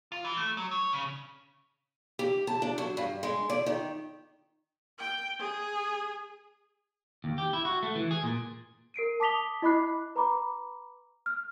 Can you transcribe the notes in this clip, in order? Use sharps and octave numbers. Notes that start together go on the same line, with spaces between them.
F4
E3
A3
F#3
C#5
C#3
G4
A5
D4
F#3
G2
G#3
D5
D#3
G5
G#4
D#2
G4
E4
F#4
A3
E3
G#4
A#2
A#4 C7 D7 D#7
A5 D6 D#6 B6 F7 G7
E4 D#5 B5 D6 F#6 C7
B4 A#5 B5 D6
F6